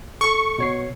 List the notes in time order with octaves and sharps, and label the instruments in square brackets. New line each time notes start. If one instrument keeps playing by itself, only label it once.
[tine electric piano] A4 [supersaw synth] C#6
[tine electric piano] B2 C#5 C7